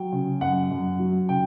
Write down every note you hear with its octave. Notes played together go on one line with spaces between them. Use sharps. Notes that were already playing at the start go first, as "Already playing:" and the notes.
Already playing: F#3 G5
C#3
F#2 F#5
F#2
F#3
C#3 G5